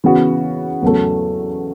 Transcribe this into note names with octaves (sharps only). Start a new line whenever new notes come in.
C#3 E3 B3 F#4
E2 C#3 F#3 A3